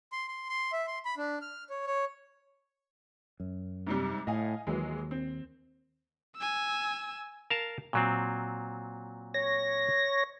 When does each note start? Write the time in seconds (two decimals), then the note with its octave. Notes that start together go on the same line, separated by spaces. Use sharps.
0.12 C6
0.28 C6
0.49 C6
0.72 E5
0.87 C6
1.05 B5
1.17 D4
1.42 F6
1.70 C#5
1.87 C#5
3.40 F#2
3.87 G#2 C3 G3
4.27 A2 D#5 F5 G#5
4.67 D#2 E3 F#3 G#3
5.11 C4
6.37 G#5 E6
7.50 A#4 F5 A5
7.93 A#2 F#3 C4
9.34 C#5 A#6